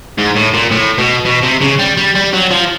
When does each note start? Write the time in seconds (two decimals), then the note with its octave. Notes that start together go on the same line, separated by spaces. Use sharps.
0.18 G#2
0.36 A2
0.54 A#2
0.71 A2
0.98 B2
1.26 B2
1.43 C3
1.62 C#3
1.79 G3
1.97 G3
2.15 G3
2.33 F#3
2.51 F3